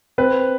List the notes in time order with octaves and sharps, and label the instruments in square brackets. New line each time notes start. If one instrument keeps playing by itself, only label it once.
[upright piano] C4 B4